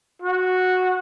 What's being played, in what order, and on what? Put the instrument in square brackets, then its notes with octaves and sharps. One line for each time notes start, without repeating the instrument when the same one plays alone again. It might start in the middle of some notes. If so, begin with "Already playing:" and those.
[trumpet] F#4